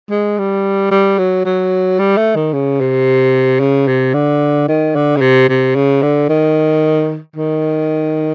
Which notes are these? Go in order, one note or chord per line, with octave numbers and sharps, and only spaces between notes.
G#3
G3
G3
F#3
F#3
G3
A3
D#3
C#3
C3
C#3
C3
D3
D#3
D3
C#3
C3
C3
C#3
D3
D#3
D#3